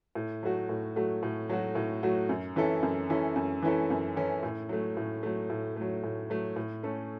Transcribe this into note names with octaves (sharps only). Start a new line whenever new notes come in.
A2
F#3 A3 F#4
A2
F#3 A3 F#4
A2
F#3 A3 F#4
A2
F#3 A3 F#4
F#2
E3 C#4 E4 A4
F#2
E3 C#4 E4 A4
F#2
E3 C#4 E4 A4
F#2
E3 C#4 E4 A4
A2
F#3 A3
A2
F#3 A3
A2
F#3 A3
A2
F#3 A3
A2
A3 C#4 A4